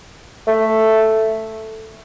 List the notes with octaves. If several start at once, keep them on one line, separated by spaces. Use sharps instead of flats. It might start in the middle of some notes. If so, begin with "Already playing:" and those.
A3